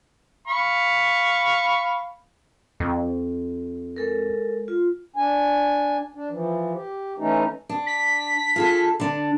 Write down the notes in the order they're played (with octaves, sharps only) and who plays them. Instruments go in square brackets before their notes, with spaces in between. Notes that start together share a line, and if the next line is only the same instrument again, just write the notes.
[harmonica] F5 B5 C#6
[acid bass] F2
[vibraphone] G#3 A4 A#4
F4
[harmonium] D4 G#5
D4
E3 F3
G4
E3 A3 C#4 D#4
[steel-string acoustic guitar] D4
[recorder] B6
[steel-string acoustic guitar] F4 G#4 A4
D3 D4